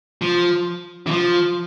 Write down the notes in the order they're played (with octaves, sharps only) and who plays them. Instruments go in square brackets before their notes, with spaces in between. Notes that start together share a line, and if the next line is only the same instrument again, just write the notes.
[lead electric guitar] F3
E3
F3